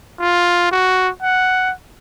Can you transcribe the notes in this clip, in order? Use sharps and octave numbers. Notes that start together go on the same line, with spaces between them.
F4
F#4
F#5